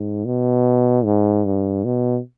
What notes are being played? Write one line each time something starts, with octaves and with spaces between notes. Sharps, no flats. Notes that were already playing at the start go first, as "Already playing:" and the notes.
Already playing: G#2
B2
G#2
G2
B2